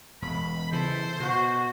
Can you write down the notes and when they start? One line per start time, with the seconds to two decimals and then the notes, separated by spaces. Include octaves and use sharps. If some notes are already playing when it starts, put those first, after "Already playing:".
0.22 E1 B5
0.72 C#3 E3 A4 C5
1.20 B2 F#4